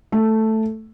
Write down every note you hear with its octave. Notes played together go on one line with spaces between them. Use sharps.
A3